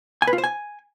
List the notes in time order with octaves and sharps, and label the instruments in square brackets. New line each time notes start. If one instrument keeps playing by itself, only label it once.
[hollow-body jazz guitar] G#5
B4
F4
C5
G#5